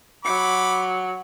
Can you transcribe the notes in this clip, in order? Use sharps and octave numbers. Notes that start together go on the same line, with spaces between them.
F#3 B5 D6